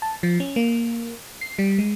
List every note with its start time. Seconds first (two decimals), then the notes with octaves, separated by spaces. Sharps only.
0.02 A5
0.23 F3
0.40 C#4
0.56 A#3
1.41 C7
1.59 G3
1.78 G#3